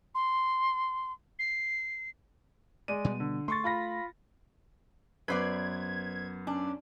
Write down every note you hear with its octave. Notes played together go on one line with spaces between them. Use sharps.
C6
C7
G#3 D5 D#7
B2 G3 B3
D3
A3 C6 C#6 A6
F4 B5 A#6
F#2 B3 B4 C5 D5 G#6
C#4 D4